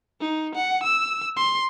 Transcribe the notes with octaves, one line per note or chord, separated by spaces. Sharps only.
D#4
F#5
E6
C6